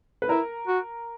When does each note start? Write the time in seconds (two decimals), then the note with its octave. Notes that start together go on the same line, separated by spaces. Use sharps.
0.22 B4
0.29 E4 A#4
0.67 F#4